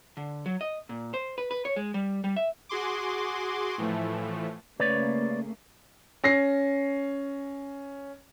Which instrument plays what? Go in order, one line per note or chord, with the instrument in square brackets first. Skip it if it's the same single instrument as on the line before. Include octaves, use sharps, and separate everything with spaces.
[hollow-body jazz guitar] D3
F#3
D#5
A#2
C5
B4
B4
C#5
G#3
G3
G3
E5
[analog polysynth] F#4 G#4 C6 D6
A2 E3 F3 A3
[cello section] C#3 A3 A#3 [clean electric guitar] B4 C#5 D5
[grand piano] C#4 A#6 C7